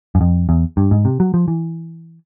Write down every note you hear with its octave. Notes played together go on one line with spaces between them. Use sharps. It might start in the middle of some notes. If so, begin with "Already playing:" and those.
F#2
F2
E2
G2
G#2
C3
F#3
F3
E3